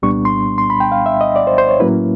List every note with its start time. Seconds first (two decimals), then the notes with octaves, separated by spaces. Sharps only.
0.02 C2 A#2 G3 B3 D4 C#6
0.25 C6
0.58 C6
0.70 B5
0.80 G5
0.92 F5
1.06 E5
1.21 D#5
1.36 D5
1.47 C5
1.58 C5
1.69 C#5
1.80 A2 F#3 A#3 C#4 E4 B4